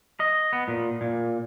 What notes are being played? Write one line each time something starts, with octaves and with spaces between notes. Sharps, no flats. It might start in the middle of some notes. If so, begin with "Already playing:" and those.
D#5
B3
A#2
A#2